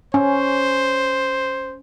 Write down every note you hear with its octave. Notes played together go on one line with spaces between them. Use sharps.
C#4 C5